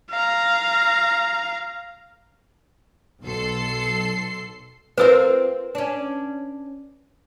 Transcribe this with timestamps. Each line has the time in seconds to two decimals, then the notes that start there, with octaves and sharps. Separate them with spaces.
0.10 F5 A#5
3.23 B1 A4 C6 C7
4.98 C4 F4 A#4 B4 E6
5.75 C#4 D4